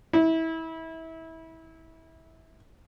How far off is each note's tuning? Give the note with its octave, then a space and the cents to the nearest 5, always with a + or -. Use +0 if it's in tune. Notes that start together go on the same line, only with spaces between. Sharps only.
E4 -25